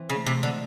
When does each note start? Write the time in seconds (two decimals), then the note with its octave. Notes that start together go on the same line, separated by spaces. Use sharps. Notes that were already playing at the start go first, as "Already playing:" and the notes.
Already playing: E3 C4
0.09 C#3
0.15 A3
0.27 C3
0.38 G#2
0.43 D3